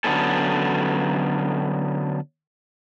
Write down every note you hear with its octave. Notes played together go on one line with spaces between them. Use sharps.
D3 F#3 B3 C#4 A4